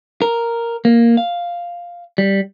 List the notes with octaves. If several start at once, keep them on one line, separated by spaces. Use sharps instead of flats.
A#4
A#3
F5
G3